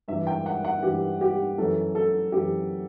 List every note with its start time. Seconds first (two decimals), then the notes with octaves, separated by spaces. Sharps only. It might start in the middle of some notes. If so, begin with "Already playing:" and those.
0.08 G2 E3 E5
0.27 G5
0.46 F#5
0.65 F#5
0.83 G2 E3 G4
1.21 G4
1.58 F#2 E3 A4
1.95 A4
2.32 F#2 E3 G4